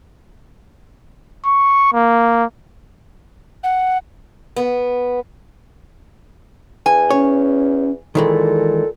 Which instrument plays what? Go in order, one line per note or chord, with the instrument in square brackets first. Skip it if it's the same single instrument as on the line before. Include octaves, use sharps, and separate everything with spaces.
[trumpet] C#6
A#3
[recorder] F#5
[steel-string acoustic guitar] B3
[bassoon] E2 [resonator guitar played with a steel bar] G#5
[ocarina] C#4 [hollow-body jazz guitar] C#5
[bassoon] A#2 [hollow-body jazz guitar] D#3 E3 G#3 [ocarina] A4